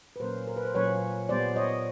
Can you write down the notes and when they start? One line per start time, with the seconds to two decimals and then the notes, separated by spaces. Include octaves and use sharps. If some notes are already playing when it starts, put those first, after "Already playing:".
0.16 B4
0.20 A#2 F#3 A#3 C#4 A#4 C5
0.47 A#4
0.57 B4
0.65 C5
0.74 A#2 F#3 A#3 C#4 B4 C#5
1.29 A#2 G3 B3 C5 D5
1.56 C#5 D#5